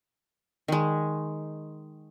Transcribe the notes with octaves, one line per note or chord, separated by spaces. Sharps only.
D#3 G#3